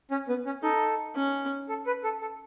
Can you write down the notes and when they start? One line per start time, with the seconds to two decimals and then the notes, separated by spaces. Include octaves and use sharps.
0.11 C#4
0.29 B3
0.46 C#4
0.63 D#4 A4
1.16 C#4
1.69 A4
1.86 B4
2.04 A4
2.21 A4